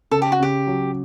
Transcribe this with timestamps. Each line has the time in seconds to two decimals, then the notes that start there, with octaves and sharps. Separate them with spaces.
0.11 C#3 A4
0.22 G4
0.32 F#4
0.40 C#3 G4
0.67 F#3